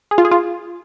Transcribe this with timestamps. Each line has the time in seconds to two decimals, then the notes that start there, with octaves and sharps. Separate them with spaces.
0.11 G#4
0.18 F4
0.25 G#4
0.31 F4